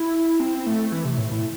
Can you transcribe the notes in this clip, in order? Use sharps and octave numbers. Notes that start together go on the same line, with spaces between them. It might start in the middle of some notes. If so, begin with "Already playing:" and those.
Already playing: E4
C4
A3
E3
C3
A2
A2